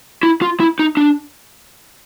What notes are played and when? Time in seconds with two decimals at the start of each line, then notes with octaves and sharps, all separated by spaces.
0.23 E4
0.42 F4
0.60 E4
0.79 D#4
0.97 D4